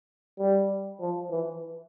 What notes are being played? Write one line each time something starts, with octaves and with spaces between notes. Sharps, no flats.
G3
F3
E3